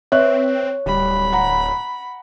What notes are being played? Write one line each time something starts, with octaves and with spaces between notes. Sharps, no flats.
C4 B4 C#5 E5 F#6
D1 G3 B5
F#5 A#5